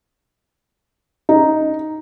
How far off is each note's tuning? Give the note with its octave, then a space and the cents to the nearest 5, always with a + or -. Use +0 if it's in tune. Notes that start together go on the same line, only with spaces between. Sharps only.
D#4 +0